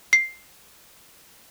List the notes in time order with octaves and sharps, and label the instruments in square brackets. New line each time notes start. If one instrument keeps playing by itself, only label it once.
[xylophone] C7